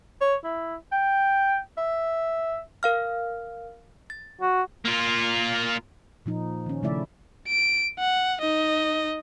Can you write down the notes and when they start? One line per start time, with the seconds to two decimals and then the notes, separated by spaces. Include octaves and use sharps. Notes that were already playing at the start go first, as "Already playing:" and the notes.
0.21 C#5
0.44 E4
0.92 G5
1.77 E5
2.83 A#4 F5 F6
4.10 A6
4.41 F#4
4.85 A#3 F4
6.26 A#2 F3 D#4
6.66 D#3 C#4
6.83 C#3 F3 A3 E4 D5 E5
7.48 D7
7.99 F#5
8.41 D#4 D#5